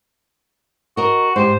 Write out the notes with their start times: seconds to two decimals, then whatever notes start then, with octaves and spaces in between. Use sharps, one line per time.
0.97 F#4 A#4 D#5
1.36 G#2 G4 C5